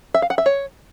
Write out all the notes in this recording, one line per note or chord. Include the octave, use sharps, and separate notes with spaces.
E5
F5
F#5
E5
C#5